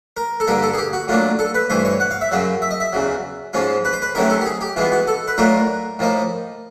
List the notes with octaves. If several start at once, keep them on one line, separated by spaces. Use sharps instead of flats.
A#4
A4
G2 D3 G3 A#3 A#4
A4
G#4
G4
F#4
A2 F#3 A#3 D4 F4
A4
B4
G2 E3 A3 C5
C#5
F#5
F5
E5
F#2 C#3 F#3 F5
E5
D#5
E5
E2 C#3 F#3
G#2 F3 G#3 C#4 F4
B4
C5
B4
C3 D#3 F#3 A3 C#4 A#4
A4
G4
G#4
G4
E3 G#3 B3 F4
F#4
A4
B4
A2 F#3 A3 D4 F4 A#4
A2 F3 A#3 D#4